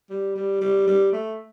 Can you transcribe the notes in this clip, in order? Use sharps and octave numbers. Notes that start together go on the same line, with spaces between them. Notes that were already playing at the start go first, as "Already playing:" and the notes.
G3
G3
G3
G3
A3